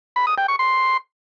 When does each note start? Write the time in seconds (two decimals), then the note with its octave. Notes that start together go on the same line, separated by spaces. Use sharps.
0.16 B5
0.27 D#6
0.38 G5
0.48 C#6
0.59 C6